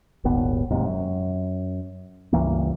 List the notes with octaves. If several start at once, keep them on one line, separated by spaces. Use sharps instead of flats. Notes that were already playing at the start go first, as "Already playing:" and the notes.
D#1 G#1 D#2 B3
E1 D#2 G#2 C3
F#2
C#2 G2 E3 A#3